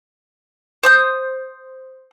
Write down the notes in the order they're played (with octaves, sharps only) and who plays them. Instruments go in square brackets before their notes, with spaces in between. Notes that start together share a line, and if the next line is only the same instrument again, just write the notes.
[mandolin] C5 D#6 G6